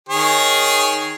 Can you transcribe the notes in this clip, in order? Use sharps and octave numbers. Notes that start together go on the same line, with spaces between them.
D#3 G#4 C#5